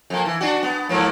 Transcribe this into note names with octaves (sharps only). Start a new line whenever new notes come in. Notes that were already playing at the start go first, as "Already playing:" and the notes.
F2 A#3
E3
D4 F#4
B3
G#2 F3 A#3